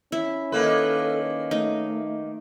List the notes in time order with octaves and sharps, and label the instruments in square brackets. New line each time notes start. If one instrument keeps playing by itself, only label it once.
[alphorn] C#4 [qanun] E4
[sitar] D#3 A#3 B4 [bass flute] A4
[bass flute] A3 [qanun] D#4